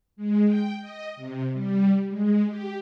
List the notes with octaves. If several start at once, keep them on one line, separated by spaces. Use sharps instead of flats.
G#3
G5
D#5
C3
G3
G#3
G4